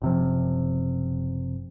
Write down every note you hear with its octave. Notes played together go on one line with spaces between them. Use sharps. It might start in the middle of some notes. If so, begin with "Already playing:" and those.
F#1 C3 F3